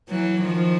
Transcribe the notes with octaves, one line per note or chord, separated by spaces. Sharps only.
E3 F#3
D#3 F3